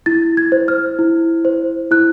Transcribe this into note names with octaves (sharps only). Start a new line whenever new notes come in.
E4 A6
G#6
C5
F6
E4
C5
E4 F#6